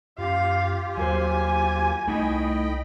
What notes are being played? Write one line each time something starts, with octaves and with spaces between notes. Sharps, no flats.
F#2 F4 G4 F5
D#2 F#3 A#4 C5 G#5
C2 A3 D#4 E4 D#5 G5 B5